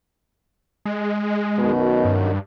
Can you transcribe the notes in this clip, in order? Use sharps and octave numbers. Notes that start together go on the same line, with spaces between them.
G#3
F#2 B2 D#3
G2